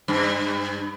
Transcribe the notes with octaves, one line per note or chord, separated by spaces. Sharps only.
G2